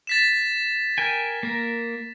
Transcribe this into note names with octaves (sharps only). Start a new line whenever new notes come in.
A6 B6 E7
A#4 G5 G#5
A#3 A#4